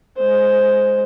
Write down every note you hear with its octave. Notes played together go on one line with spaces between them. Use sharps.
G#3 C5